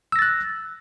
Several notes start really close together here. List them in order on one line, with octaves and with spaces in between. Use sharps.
E6 A#6 A6 F#6